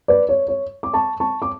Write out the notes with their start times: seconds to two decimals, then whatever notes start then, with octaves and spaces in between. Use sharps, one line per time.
0.08 B4 D5
0.29 C#5
0.48 C#5
0.83 D6
0.93 A5 C#6
1.20 A5 C#6
1.42 D6